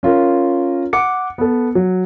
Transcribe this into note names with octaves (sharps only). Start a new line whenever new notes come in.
C#4 F4 A#4
F#5 D6 C#7
B3 A4
F#3